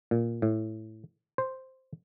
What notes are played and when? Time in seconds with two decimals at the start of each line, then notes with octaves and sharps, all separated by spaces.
0.11 A#2
0.42 A2
1.38 C5